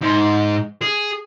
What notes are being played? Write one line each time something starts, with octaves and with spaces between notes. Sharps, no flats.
G#2
G#4